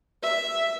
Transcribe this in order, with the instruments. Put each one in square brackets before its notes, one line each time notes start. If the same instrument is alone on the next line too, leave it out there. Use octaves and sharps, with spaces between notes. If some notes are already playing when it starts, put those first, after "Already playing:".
[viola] E5